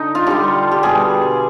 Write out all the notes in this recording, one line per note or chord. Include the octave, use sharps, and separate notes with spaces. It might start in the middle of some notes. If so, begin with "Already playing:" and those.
Already playing: D3 D#4
F4
D3 G3 G4
G4
B2 G3 G#4